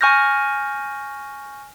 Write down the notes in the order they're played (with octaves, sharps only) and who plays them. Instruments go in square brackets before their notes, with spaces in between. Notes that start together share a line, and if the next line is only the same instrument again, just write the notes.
[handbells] G#5 C#6 F6 G6 A#6